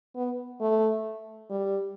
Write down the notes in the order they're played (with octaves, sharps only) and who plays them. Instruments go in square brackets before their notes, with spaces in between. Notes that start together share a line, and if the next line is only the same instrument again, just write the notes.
[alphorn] B3
A3
G3